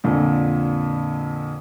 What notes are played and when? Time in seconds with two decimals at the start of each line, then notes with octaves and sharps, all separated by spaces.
0.04 F2 A#2 D3